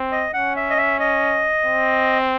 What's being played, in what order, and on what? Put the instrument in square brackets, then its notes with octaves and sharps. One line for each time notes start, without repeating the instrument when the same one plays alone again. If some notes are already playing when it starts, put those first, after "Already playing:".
Already playing: [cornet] C4
[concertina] D#5
[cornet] C#4 [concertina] F#5
[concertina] E5
D#5
E5
D#5
[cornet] C4